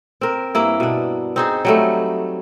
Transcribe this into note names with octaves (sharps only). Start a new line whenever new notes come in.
C4 A#4
G2 A#3 E4
B2 D4
C4 D#4 G#4
F#3 G3 A3